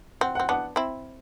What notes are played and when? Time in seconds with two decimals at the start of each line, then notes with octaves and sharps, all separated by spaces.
0.21 C4 F#5
0.35 C4 F#5
0.49 B3 D4 F#5
0.76 C4 E4